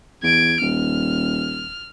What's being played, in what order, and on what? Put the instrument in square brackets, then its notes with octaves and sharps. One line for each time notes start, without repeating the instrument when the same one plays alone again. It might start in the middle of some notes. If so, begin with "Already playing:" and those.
[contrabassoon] E2 [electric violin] G#6 D7
[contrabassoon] D#1 [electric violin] F6